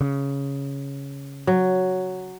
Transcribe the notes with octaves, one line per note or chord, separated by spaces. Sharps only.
C#3
F#3